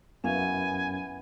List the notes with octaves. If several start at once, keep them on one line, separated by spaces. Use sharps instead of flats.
F#2 B3 C#4 E4 F5 G#5